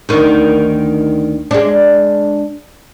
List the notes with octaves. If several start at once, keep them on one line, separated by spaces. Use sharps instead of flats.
D2 D#3
G#3 D4